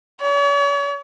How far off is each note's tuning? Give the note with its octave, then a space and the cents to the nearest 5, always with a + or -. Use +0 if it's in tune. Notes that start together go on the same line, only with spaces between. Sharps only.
C#5 +45